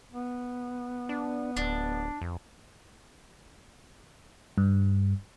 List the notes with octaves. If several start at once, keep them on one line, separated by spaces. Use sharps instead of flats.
B3
D4
D1 D4
F2
G2